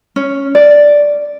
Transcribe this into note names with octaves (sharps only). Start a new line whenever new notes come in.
C#4
D5